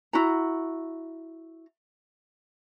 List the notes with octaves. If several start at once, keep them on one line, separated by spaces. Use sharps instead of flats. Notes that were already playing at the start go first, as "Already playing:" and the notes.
E4 F#4 A#5